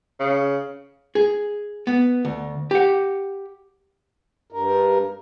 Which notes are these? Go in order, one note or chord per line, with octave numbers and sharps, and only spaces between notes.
C#3
G#4
B3
D2
G4 F#5
G2 A#4